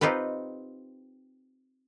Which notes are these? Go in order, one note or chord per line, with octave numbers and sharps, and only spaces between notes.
C4 D#4 F4 G4 B4